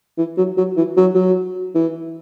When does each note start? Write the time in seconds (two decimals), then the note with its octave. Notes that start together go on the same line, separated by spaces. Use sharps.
0.18 E3
0.37 F#3
0.57 F#3
0.77 E3
0.97 F#3
1.15 F#3
1.75 E3